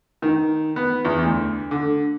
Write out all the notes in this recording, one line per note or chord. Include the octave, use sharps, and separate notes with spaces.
D#3
B3
E2
D2
D3